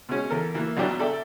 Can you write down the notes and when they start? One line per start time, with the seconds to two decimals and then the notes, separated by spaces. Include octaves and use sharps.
0.09 B2 G#3 C#4
0.30 E2 A4 A#4
0.54 E3 A#3
0.77 A#1 B2 F#3 G3 D4 G5
0.99 A4 D5 E5 G5